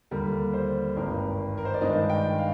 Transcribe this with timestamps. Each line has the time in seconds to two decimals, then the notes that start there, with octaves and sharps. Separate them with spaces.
0.11 D#2 D3 G3 A#4
0.53 C5
0.96 G#1 G2 D#3 A#4
1.57 A#4
1.65 C5
1.74 D5
1.81 G2 D#3 G#3 D4 D#5
2.10 G5
2.38 F5